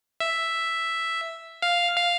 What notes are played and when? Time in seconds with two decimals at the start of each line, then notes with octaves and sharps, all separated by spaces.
0.20 E5
1.62 F5
1.97 F5